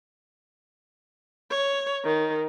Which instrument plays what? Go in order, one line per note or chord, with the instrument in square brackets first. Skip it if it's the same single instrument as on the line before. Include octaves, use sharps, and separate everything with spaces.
[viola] C#5
D#3